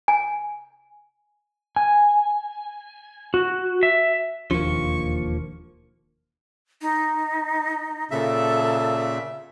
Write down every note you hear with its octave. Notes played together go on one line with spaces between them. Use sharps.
G#5
G#5
F#4
E5
E1 D#2 F3 A#3 D4 C#6
D#4
A#2 C#3 A4 E5